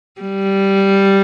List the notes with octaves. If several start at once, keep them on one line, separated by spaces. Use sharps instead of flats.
G3